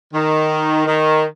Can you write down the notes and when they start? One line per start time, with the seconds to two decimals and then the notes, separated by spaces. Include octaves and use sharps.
0.14 D#3
0.87 D#3